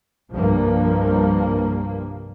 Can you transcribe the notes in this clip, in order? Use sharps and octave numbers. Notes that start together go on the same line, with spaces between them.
C2 G2 F3 A#3